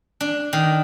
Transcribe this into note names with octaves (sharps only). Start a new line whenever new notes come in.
D4
D#3